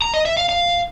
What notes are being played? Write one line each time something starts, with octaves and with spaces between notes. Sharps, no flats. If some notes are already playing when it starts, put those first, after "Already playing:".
A#5
D#5
E5
F5
F5